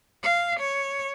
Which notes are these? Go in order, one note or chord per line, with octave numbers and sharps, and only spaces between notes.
F5
C#5